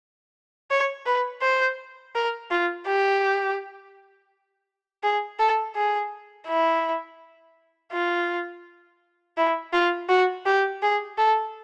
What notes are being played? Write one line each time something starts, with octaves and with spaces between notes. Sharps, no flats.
C#5
B4
C5
A#4
F4
G4
G#4
A4
G#4
E4
F4
E4
F4
F#4
G4
G#4
A4